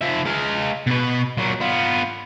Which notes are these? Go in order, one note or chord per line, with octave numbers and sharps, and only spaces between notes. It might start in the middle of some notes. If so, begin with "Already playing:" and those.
F3 E5
G#3 F5
B2 B4
A#2 F#3
B3 F4